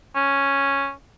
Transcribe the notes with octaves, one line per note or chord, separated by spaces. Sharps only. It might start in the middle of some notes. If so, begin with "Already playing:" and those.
C#4